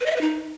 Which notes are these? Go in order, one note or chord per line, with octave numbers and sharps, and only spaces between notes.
B4
D#5
E5
B4
D#4